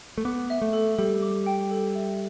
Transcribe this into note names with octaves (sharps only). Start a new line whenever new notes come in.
A3
B3 D6
E5
A3
A4
G3 A4
D6
G5
A4
E5